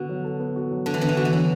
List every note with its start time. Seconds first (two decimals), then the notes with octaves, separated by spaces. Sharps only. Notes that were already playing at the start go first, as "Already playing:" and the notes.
Already playing: D3 B3 F#4
0.09 F#3
0.24 A4
0.40 B3
0.56 F#4
0.71 F#3
0.86 D3 A4
0.94 E3
1.01 D3 B3
1.09 E3
1.17 D3 F#4
1.25 E3
1.32 D3 F#3